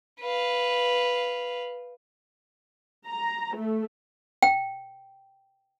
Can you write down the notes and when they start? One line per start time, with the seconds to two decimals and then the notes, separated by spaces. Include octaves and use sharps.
0.20 B4 F5
3.05 A#5
3.56 A3
4.43 G5